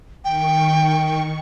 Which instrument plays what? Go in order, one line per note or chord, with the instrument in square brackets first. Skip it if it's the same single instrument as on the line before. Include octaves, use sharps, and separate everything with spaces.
[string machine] D#3 C#6 [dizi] G5